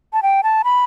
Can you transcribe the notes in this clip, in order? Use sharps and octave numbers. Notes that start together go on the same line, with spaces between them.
A5
G5
A5
B5